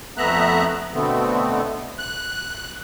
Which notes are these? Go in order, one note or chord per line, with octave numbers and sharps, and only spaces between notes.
F2 A3 B3 E5 A#5 F#6
B2 D3 A3 B3 C4
F#6